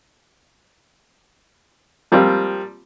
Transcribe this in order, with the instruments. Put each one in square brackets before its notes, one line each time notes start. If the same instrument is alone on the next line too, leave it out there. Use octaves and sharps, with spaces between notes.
[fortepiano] F3 G3 A#3 C4 F4